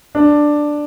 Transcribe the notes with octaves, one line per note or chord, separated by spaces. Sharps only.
D4